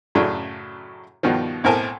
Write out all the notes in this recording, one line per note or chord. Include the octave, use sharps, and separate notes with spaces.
F#2 A2 C#3 F#3 A3 D4
G2 B2 D#3 F3
B1 A2 C4 A#4 G#5 A5